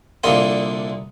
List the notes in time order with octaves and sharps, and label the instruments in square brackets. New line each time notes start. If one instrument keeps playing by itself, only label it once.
[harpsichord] C2 A#2 D3 A#3 D#5 C6